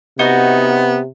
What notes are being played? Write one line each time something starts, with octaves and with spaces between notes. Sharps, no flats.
C3 B3 D#4 F#4 D#5